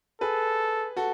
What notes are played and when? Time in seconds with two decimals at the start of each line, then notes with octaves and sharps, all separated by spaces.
0.21 G#4 A4 B4
0.97 F#4 A4